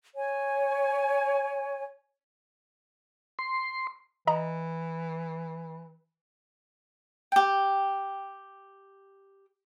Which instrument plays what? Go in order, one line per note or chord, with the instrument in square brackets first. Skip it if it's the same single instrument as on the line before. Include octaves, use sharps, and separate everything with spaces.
[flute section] C#5 G#5
[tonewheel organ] C6
[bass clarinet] E3 [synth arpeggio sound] D#5 A#5
[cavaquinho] G4 G5